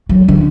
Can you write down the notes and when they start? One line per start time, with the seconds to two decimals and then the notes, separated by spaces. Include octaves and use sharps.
0.09 F#3
0.28 D3